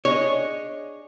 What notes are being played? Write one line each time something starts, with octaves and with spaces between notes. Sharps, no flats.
D4 G#4 C#5 D#5